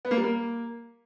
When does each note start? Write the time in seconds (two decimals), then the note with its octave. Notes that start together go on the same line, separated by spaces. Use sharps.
0.05 B3
0.11 A#3
0.17 G3
0.24 A#3